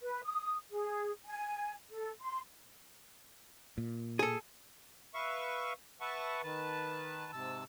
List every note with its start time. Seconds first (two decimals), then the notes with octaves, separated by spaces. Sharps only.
0.02 B4
0.24 D#6
0.71 G#4
1.26 G#5
1.91 A4
2.22 C6
3.78 A#2
4.19 G#4 A4
5.14 B4 E5 F5 C#6
6.01 B4 E5 F#5 A5 C#6
6.43 D#3 B4 A5
7.33 G#2 C3 A5 E6